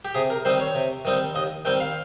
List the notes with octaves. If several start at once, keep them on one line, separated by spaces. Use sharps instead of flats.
G4
C3 G#4
A#4
D#3 G3 C4 D#4 C5
C#5
C3
D#3 G3 C4 D#4
D#2 D#5
D#3 G3 C4 G5
F5